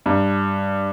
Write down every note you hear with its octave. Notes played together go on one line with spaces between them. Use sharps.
G2